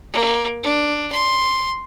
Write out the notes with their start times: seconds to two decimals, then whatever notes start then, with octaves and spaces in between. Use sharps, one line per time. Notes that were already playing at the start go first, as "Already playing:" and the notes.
0.13 A#3
0.63 D4
1.12 C6